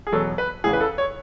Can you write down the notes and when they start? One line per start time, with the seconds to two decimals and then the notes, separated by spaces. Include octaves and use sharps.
0.07 G#4
0.12 E2 B2 F#3 A4
0.38 B4
0.64 E2 C#3 E3 G#4
0.73 B4
0.81 A4
0.98 C#5